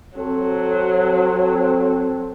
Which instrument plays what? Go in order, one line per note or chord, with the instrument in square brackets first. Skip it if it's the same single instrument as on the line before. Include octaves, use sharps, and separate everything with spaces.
[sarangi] F#3 [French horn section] C4 A4